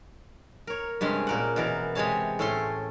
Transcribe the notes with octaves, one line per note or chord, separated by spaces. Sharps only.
A#4 C#5
G2 C3 G#3 C#4
A#2 A#4 F#5
B2 E3 A#4
C3 G#3 G#4 C#5 A5
A2 A3 C#4 A4 C6